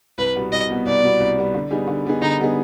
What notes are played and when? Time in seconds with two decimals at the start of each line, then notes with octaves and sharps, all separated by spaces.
0.18 C2 B4
0.36 B2 G3 B3
0.52 C2 D#5
0.70 B2 G3 B3
0.86 C2 D5
1.03 B2 G3 B3
1.20 C2
1.37 B2 G3 B3
1.54 D3
1.71 G3 B3 D#4 G#4
1.88 D3
2.05 G3 B3 D#4 G#4
2.22 D3 D#4
2.39 G3 B3 D#4 G#4